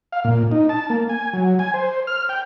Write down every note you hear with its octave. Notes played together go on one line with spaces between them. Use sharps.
F5
A#2
D#4
A5
A#3
G#5
F#3
G#5
C5
F6
G5